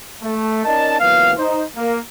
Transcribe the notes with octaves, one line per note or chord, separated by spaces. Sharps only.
A3
C#4 D#4 A#4 D5 D#5 A5
C#2 E3 F#3 A#3 B3 F5
D#4 C5
A#3